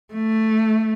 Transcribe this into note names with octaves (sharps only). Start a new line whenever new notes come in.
A3